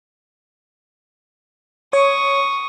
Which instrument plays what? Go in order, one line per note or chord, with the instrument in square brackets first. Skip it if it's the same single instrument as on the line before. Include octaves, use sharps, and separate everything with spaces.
[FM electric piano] C#5 [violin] C#6 D#6